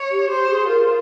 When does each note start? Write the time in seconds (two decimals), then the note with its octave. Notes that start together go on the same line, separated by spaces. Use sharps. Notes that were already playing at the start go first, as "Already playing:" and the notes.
Already playing: C#5
0.11 G4
0.30 G4 C5
0.49 G#4
0.68 F4 A#4